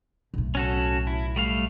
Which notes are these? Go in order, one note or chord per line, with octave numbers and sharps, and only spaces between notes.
B1 A2
C#4 F#4 A4
E4
G3 A3 F5